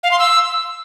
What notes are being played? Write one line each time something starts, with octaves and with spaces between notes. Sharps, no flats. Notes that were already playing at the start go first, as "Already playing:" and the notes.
F5
C6
E6